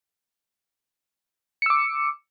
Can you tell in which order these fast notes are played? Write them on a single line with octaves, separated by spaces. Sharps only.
C#7 E6 D6